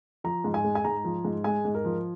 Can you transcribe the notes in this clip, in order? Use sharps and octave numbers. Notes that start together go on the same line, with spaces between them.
F3 A#5
G#2
G#5
G#3
G#5
G#2 A#5
F3
G#2
G#3 G#5
G#2
A#4
F3